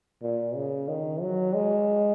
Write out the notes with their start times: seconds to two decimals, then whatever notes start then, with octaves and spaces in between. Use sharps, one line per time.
0.22 A#2
0.55 C#3
0.88 D#3
1.22 F#3
1.54 G#3